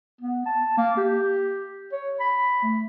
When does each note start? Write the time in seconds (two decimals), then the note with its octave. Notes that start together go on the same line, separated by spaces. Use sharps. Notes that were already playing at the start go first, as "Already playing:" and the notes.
0.21 B3
0.45 A5
0.77 A#3
0.97 G4
1.92 C#5
2.20 B5
2.63 A3